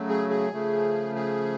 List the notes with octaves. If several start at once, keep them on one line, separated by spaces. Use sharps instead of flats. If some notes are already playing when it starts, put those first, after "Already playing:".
Already playing: C#3 F#3 A3
G#4
G#4
C#3 F3 A3
G#4